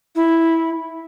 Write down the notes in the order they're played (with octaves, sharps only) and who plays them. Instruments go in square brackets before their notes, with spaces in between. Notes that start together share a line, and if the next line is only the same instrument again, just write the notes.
[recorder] E4